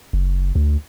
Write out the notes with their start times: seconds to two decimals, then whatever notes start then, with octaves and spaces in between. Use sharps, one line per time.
0.13 F#1
0.55 D2